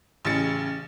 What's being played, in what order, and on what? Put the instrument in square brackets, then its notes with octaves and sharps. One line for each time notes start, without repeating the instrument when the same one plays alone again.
[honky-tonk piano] A1 C#3 A6 C#7